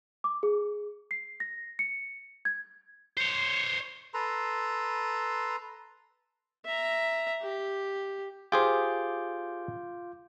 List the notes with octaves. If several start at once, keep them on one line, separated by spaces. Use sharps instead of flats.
D6
G#4
C7
A#6
C#7
G#6
C5 C#5
A4 B4 A#5 C6
E5 A#5
G4
F4 G4 G#4 C5 D6 G6